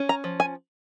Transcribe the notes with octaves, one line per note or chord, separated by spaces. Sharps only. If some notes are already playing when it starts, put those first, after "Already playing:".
Already playing: C#4
A#5
F3
G#5